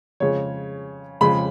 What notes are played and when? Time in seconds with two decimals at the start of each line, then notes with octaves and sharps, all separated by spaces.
0.20 F2 C#3 G#3 C#5
1.21 F2 C#3 G#3 B5